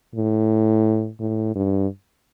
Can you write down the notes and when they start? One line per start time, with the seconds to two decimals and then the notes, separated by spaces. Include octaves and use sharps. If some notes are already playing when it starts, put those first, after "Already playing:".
0.15 A2
1.20 A2
1.56 G2